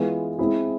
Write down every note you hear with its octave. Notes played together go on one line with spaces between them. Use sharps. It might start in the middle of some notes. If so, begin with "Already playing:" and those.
Already playing: E3 G#3 B3 F4
G#3 C4 E4 G#4